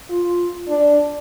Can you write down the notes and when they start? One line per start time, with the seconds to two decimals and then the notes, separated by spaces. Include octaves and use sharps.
0.10 F4
0.69 D4